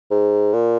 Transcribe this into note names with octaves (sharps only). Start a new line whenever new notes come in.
G#2
A#2